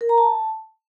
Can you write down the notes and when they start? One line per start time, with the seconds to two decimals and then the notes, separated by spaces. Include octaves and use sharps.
0.01 A#4
0.09 A#5
0.18 A5